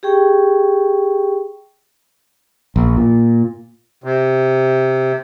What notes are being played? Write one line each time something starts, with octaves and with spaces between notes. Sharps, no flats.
G4 G#4 G5 C#6
A#1
A#2
C3